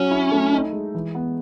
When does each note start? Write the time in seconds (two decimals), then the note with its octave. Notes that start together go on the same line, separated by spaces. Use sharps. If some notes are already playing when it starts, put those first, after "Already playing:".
Already playing: F#3 C#4
0.11 E4
0.32 A3
0.53 D#4
0.73 G#3
0.95 E3
1.15 B3